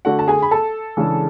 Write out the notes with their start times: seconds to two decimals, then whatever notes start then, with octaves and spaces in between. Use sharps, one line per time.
0.05 D3 A3 D4 F#4 F#5
0.19 A5
0.28 G#4 G#5
0.42 B5
0.51 A4 A5
0.97 C#3 E3 G#3 D4